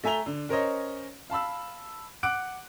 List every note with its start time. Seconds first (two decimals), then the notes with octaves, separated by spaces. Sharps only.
0.04 A3 E5 G#5 A#5 F7 G7
0.26 D3
0.49 C#4 A#4 C5 C#5 D#5
1.30 F5 A5 B5 E6
2.23 F#5 D6 F#6 D7